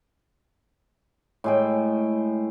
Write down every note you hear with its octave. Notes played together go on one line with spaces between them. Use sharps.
A2 G#3 G5